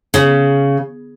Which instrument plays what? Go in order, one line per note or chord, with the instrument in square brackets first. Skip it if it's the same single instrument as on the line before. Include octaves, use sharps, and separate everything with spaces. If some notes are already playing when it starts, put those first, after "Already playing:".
[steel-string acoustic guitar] C#3